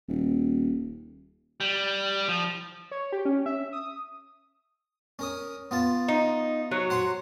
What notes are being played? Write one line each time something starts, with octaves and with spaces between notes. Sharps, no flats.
D#1
G3
F3
C#5
G4
C#4
E5
D#6
C#4 A#4 D#6
B3 F4 A5
D#4
F#3 F#4 C#5
C5 F#5 C6